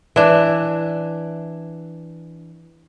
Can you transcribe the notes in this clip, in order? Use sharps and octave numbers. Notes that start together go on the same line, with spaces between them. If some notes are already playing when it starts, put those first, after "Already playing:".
E3 D4